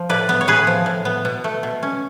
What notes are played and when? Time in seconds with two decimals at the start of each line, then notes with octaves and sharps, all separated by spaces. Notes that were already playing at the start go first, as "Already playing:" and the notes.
Already playing: F3
0.09 A2 B4 D5
0.29 B3
0.41 C#5
0.47 A2 G#4 B4
0.67 F3
0.86 A2
1.05 B3
1.25 B2
1.44 A3
1.63 B2
1.83 C#4